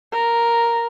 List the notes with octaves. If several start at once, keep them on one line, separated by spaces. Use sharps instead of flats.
A#4